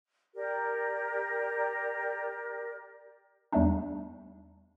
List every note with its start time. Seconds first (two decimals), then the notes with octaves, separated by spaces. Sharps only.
0.35 G4 A#4 D5
3.52 E2 G3 A3 B3 D4 D#4